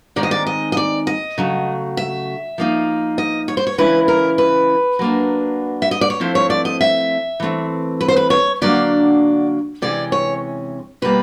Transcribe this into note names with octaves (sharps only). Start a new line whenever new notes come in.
D#3 G#3 C4 D#4 D5
D#5
D5
D#5
D#5
D5
D#5
C#3 F#3 A3
E5
F3 A#3 D#4
D#5
C#5
C5
C#5
C#3 E3 G#3 C#4 E4 B4
A#4
B4
F#3 A#3 D4
E5
D#5
D5
C#5
F3 A3 C4 E4 C5
C#5
D5
D#5
E5
E3 A3 C4
B4
C5
B4
C#5
D3 F#3 A#3 D4 D5
C3 E3 G#3 C#4 D5
C#5
B2 G3 A#3 B4